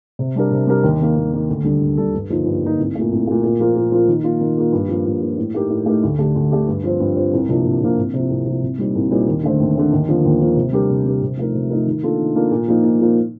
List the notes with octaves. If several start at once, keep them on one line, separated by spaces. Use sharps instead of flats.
C3
G3 D4 G4 A#4
C3
G3 D4 G4 A#4
D#2
D#3 A#3
D#2
D#3 A#3
D2
D3 G3 D4 A4
D2
D3 G3 D4 A4
G2
D3 F3 A#3 D#4
G2
D3 F3 A#3 D#4
C2
A#2 A3
C2
A#2 A3
A#2
F3 A#3 F4
A#2
F3 A#3 F4
D#3
A#3 F4
D#3
A#3 F4
G2
F3 A#3
G2
F3 A#3
A2
A3 D#4 G4 A#4
A2
A3 D#4 G4 A#4
D2
D3 A3 D4 G4
D2
D3 A3 D4 G4
G2
F3 C4
G2
F3 C4
C2
C3 F3 A#3 D4
C2
C3 F3 A#3 D4
C2
C3 F3
C2
C3 F3
C2
A#2 G3 C4 D#4
C2
A#2 G3 C4 D#4
D#2
D3 A3 C4
D#2
D3 A3 C4
D#2
D3 F3 A#3
D#2
D3 F3 A#3
C3
G3 D4 G4 A#4
C3
G3 D4 G4 A#4
C3
F3 A3 D#4 A#4
C3
F3 A3 D#4 A#4
D#3
A#3 D4 F4 A4
D#3
A#3 D4 F4 A4
A#2
F3 A#3 D#4
A#2
F3 A#3 D#4